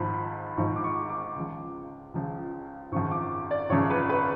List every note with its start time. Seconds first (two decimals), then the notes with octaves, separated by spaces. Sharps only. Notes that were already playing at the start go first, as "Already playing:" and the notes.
Already playing: G#1 G#2 F3 B5
0.57 G#1 G#2 F3 C#6
0.76 D6
0.84 C#6
1.09 D6
1.36 C#2 C#3 F3
2.14 C#2 C#3 F3
2.92 G#1 F#2 C#3 F3 C#6
3.11 D6
3.51 D5
3.70 G#1 F#2 C#3 F3 C#5
3.90 B4
4.09 B4